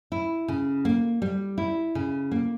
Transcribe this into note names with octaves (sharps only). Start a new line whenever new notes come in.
E4
C#3
A#3
G3
E4
C#3
A#3